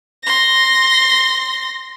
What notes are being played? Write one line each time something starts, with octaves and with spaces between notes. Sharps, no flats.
C6 A#6